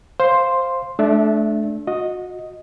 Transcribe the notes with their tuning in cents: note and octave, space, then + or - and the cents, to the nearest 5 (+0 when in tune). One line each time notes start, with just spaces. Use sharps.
C5 +10 F5 +0 C6 +0
A3 -30 D4 +0 E5 +0
F#4 -30 D#5 +0